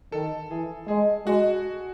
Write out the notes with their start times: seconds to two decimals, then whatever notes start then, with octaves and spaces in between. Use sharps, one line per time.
0.12 D#3 A4
0.50 E3 G#4
0.88 G#3 G#4
1.26 G#3 F#4